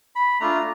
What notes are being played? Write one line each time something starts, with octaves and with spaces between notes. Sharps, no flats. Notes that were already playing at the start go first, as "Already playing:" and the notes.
B5
A3 D4 F4 A#5